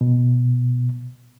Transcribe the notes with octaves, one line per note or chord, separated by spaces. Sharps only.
B2